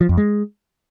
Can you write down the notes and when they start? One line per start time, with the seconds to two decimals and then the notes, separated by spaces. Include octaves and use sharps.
0.01 F3
0.09 F2
0.17 G#3